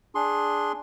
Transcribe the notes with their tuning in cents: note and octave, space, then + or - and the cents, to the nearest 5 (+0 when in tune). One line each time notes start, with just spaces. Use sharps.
D4 +0 G#4 +0 C6 +15